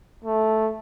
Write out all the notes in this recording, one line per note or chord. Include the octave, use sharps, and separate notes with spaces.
A3